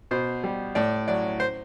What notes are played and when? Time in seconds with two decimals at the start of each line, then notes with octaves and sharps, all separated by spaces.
0.11 B2 C5
0.44 G3
0.75 A2 D5
1.08 F#3 D5
1.40 C5